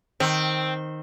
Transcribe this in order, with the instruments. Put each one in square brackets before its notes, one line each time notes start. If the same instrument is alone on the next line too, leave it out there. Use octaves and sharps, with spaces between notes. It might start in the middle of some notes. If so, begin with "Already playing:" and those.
[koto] D#3 [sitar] C4